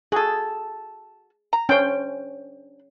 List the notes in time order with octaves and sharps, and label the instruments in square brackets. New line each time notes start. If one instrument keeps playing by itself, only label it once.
[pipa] F#4 A4 [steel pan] G#4
[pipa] A#5
[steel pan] C#4 G5 [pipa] D4 C5